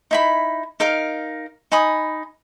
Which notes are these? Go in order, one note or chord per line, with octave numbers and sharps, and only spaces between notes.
D#4 E4 B5
D#4 A#4 F5
D#4 G#5 B5 D#6